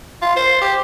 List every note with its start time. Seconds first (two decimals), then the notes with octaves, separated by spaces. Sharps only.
0.22 F4
0.36 C5
0.62 G4